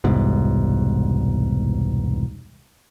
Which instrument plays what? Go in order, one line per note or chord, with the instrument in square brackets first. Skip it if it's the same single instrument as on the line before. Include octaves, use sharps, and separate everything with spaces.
[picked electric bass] E1 C2 G#2 B2